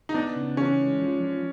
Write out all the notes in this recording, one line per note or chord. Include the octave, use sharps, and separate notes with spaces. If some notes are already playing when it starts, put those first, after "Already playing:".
D#4
B3 D4
C#3
E3 C#4
G#3
F3
F3